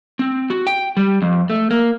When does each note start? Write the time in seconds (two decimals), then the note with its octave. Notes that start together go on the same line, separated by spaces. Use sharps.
0.19 C4
0.50 F#4
0.67 G5
0.97 G3
1.22 F2
1.50 A3
1.71 A#3